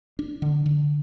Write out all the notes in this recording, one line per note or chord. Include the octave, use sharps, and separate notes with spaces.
D4
D3
D3